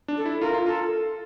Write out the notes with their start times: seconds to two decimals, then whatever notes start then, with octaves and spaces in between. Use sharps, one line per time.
0.08 D4
0.17 A4
0.25 E4
0.41 F4 A#4
0.54 F4
0.66 F4 A4